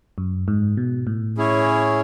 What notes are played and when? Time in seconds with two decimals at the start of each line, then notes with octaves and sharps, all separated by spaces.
0.18 F#2
0.48 G#2
0.77 B2
1.07 A2
1.37 C#4 E4 G#4 C#5